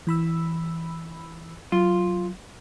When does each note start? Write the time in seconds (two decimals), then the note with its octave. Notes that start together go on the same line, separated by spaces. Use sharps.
0.07 E3 B5 E6
1.72 F#3 F4